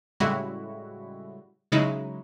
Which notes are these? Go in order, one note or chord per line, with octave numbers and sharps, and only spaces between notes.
A2 C#3 G3 G#3 E4 F#4
C#3 F#3 G#3 D#4 E4